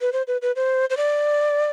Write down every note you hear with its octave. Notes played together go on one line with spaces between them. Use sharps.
B4
C5
B4
B4
C5
C5
D5